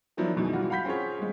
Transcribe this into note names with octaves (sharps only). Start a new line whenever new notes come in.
D#3 F3 F#3 B3 D4 E4
F#2 B2 D#3 E3 G#3
E3 G3 F4 F#4
F5 F#5 B5 G6 B6
C4 C#4 F4 G#4 C#5
G3 G#3